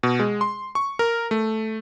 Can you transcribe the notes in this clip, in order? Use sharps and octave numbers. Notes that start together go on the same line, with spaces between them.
B2
G#3
C6
C#6
A#4
A3